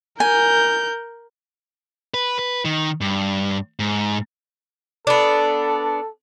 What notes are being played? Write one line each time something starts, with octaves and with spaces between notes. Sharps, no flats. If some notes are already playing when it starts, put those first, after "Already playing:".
A#4 G#5 G6
B4
B4
D#3
G2
G#2
B3 D4 A4